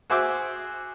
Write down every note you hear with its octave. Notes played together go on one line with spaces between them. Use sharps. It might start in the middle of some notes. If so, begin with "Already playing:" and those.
F#4 G#4 C5 E5 D6 E6